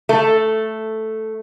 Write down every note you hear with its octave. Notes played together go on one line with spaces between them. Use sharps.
A3